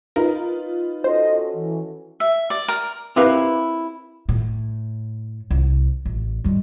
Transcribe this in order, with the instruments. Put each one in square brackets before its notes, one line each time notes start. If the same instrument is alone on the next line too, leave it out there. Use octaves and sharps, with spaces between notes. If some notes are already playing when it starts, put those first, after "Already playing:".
[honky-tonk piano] D#4 F4 B4 [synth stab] A#4
[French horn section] C#4 F#4 A4 [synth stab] C5 [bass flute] D#5
[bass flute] E3
[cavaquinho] E5
D5
A#4
[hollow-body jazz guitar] C4 E4 G4 A#4 B4 F5
[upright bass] A2
C2
A1
G3 G#3